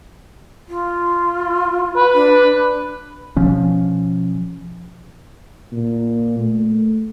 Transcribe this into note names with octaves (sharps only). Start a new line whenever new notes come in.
F4
B4
D4
B2 F3 C#4
A#2
A3